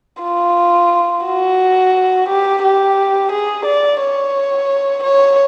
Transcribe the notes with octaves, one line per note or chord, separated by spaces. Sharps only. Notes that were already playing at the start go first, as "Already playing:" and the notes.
F4
F#4
G4
G4
G#4
D5
C#5
C#5